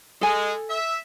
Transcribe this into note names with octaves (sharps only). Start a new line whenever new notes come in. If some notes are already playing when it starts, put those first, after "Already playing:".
G#3 A4 G#5
E5